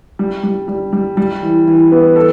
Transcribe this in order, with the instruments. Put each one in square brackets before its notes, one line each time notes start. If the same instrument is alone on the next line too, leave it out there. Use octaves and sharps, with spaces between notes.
[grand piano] G3
G3
G3
G3
G3
E3
E3
B3
A4